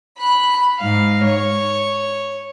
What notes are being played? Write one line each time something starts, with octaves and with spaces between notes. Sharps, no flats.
B5 F#6
G#2 F5
C#5